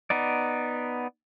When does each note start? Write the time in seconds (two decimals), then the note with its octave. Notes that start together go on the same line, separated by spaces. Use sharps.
0.10 B3 D#4 D5